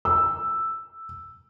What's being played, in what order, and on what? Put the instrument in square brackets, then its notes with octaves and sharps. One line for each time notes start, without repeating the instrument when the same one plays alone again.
[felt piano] E6